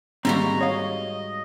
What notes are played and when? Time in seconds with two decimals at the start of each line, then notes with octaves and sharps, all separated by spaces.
0.25 G#2 D#3 G3 A#3 C4 F#4 A#5
0.61 C#5 D#5 F5